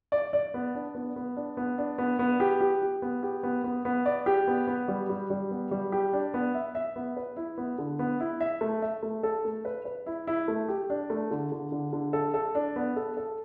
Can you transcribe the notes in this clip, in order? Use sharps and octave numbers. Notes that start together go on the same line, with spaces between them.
D5
D5
B3
D4
B3
B3
D4
B3
D4
B3
B3
G4
G4
G4
B3
G4
B3
B3
B3
D5
G4
B3
B3
G3
G3
G3
B3
G3
G4
D4
B3
E5
E5
B3
B4
E4
B3
D3
B3
E4
E5
A3
E5
A3
A4
A3
B4
B4
E4
E4
A3
G4
D4
A3
D3
D3
D3
D3
A4
A4
D4
B3
A4
A4